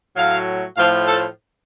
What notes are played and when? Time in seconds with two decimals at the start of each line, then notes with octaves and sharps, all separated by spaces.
0.16 A2 F#3 F5
0.76 A2 F3 F5
1.06 A4